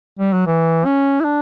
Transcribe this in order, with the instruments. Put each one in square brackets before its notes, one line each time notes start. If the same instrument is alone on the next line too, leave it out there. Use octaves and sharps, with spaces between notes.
[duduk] G3
F#3
E3
C#4
E4
D4